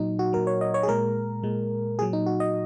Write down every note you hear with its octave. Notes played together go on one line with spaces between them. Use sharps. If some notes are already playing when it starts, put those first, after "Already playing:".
Already playing: A#2 F#3 D#4
F#4
A#2 F#3 A#4
C#5
D#5
C#5
G#4
A#2 G#3 A#4
A#2 G#3
A#2 F#3 G#4
D#4
F#4
D#5